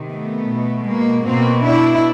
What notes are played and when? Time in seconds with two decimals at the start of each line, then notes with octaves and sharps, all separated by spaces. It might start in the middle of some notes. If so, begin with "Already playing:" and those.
Already playing: C3 D#3
0.09 A3 B3
0.48 B2
0.87 G#3 A#3
1.25 B2 A#3 C4
1.65 D4 E4